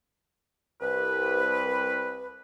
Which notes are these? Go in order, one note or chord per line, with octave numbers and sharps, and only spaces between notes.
C2 B4